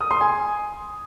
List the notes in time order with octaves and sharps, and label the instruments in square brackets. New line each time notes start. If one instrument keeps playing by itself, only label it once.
[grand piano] D#6
C6
G#5